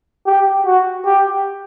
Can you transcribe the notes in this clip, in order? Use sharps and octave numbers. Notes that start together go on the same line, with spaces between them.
G4
F#4
G4